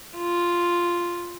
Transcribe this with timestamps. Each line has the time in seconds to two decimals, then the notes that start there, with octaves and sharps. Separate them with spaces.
0.17 F4